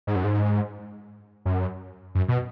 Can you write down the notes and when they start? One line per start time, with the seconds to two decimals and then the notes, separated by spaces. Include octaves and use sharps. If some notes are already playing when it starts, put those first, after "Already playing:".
0.07 G#2
0.16 F#2
0.24 G#2
1.45 F#2
2.15 F#2
2.28 B2